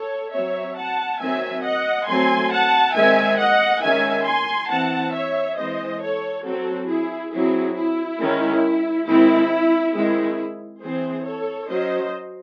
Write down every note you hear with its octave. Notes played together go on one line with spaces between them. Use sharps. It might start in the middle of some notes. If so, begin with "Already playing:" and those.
Already playing: A4 C#5
F#3 C4 C#5 E5
F#5 A5
D#3 F#3 C4 E5 G#5
D#5 F#5
F#3 A3 C4 G#5 C6
F#5 A5
D#3 G#3 C4 E5 G#5
D#5 F#5
D#3 G#3 C#4 E5 G#5
G#5 C6
E3 C4 F#5 A5
C#5 E5
E3 G#3 C4 C5 D#5
A4 C#5
F#3 C4 F#4 A4
E4 G#4
F#3 C4 E4 G#4
E4
D#3 G#3 C#4
D#3 G#3 C4 E4
D#3 G#3 C4 E4 G#4
E3 C4 G#4 C5
A4 C#5
F#3 C#4 C5 D#5